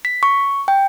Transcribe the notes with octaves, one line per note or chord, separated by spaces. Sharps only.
B6
C#6
G5